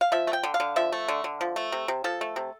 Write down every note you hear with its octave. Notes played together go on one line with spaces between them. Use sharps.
F5
F3 E5
A3
G5
D3
F5
D3
F3 E5
A3
D3
D3
F3
A3
C3
C3
F3 A4
A3
C3